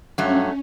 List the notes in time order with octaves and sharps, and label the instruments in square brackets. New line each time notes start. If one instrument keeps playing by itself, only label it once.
[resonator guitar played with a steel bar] G2 F#3 A3 [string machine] C#4